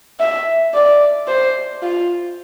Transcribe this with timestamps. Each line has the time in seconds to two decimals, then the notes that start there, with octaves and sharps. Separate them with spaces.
0.20 E5
0.74 D5
1.28 C5
1.82 F4